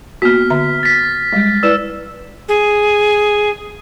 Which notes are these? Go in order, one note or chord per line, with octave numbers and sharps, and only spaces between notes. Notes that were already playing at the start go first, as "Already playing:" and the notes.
A#3 B3 F#4 F6 B6
D3 E5 A#5
A6 B6
G3 G#3
E4 B4 D5 E6 E7
G#4